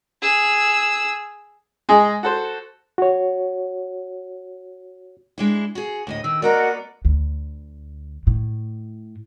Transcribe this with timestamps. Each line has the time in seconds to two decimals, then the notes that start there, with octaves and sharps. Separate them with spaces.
0.22 G#4 E6
1.89 G#3 G#4 D#5
2.23 F#4 A4 C5
2.98 F#4 C#5
5.38 G#3 D4 E4
5.75 F#4 G#4
6.07 D2 A2 D#5
6.24 D#3 E6
6.42 A#3 B3 F#4 A#4 D5 D#5
7.05 D2
8.27 A2